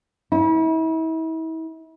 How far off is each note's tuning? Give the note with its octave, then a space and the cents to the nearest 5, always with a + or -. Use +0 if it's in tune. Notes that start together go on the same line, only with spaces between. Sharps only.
E4 -40